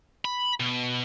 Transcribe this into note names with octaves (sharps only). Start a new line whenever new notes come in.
B5
B2